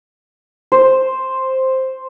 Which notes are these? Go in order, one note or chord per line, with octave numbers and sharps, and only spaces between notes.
C5